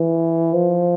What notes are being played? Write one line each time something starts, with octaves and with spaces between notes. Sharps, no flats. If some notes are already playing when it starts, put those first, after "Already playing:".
Already playing: E3
F3